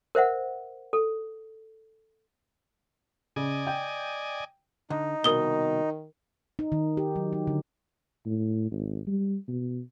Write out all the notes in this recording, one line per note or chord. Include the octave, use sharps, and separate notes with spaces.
A#4 C5 E5 F#5
A4
C#3 D5 D#5 G#5
G5
D3 D#4
C2 F2 B2 D#3 A#4 D#6 G7
D#4
D#3
G4
F#3
D#4
D3
A2
G#1
G3
B2